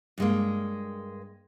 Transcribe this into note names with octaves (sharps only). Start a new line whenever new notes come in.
G2 G#3 A#3